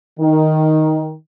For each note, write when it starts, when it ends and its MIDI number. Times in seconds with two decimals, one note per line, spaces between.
0.20 1.13 51